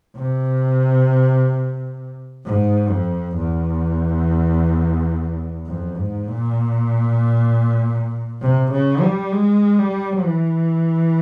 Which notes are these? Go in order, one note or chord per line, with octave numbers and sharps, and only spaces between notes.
C3
G#2
F2
E2
F2
G#2
A#2
C3
C#3
G3
G#3
G3
E3